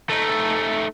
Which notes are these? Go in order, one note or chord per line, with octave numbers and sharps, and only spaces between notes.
A3 D#4